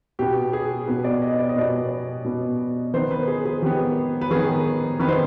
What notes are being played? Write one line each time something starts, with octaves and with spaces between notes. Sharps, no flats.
B2 B3 G4
G#4
B2 B3 B4
D5
D#5
D5
D#5
B2 B3 D5
B2 B3
D#3 B3 C5
B4
G#4
G#4
D#3 B3 G4
B4
D#3 B3 G#4
D#3 B3 B4
C5